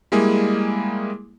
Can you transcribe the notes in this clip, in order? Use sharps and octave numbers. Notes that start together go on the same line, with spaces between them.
G3 G#3 A#3 E4 G#4